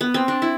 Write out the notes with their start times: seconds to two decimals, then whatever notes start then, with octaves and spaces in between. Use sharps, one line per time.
0.01 B3
0.14 C4
0.28 D4
0.42 E4